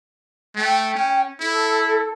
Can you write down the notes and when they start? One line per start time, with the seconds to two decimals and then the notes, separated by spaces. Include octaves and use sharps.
0.55 A3 G5
0.95 C#4
1.40 E4 A4